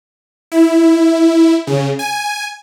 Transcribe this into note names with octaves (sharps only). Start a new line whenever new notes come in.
E4
C#3
G#5